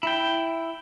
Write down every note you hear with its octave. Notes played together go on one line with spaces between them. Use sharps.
E4 G5